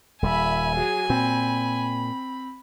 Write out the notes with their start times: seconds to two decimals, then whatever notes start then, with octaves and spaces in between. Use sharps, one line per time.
0.22 D#1 G3 E5 G#5 B5
0.75 F#3 G#4
1.10 A#2 C4 B5